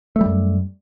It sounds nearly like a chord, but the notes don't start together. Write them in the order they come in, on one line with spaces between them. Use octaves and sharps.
A3 G3 F#2